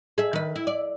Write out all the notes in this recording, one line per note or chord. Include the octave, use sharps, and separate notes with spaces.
G#4 E5
D#3 B4
E4
D5